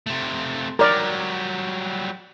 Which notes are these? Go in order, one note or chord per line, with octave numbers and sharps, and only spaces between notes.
C3 A3
F#3 G3 A#4 D5